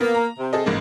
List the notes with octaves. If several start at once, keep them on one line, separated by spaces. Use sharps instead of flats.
A#3 B3
A#5
C3
G#4 A4 D#5
A1 G#2 A#3